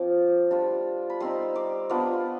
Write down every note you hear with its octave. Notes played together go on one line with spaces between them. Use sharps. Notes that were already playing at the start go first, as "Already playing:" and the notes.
Already playing: F3 C4 F4 D6
G3 D4 F4
B5
G3 C4 D#4 C6
D6
B3 D4 F4 D6